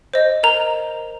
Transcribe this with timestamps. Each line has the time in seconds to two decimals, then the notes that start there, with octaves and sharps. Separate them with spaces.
0.14 C5 D#5
0.43 A#4 A#5